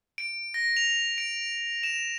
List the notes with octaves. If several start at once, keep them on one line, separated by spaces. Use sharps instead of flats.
D7
A#6
F7
D7
E7